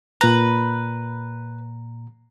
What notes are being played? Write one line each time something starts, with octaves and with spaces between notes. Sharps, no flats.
A#2 B4 A#5